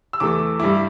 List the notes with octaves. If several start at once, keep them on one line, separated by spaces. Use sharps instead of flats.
E6
E2 E3 A3 D6
G2 G3 E4 D6